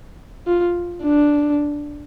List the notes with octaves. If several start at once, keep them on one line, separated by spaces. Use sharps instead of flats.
F4
D4